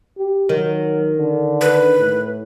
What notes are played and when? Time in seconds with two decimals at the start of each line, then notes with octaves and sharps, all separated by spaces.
0.18 G4
0.49 D#3 F#3
1.18 D3
1.61 B4
1.99 A2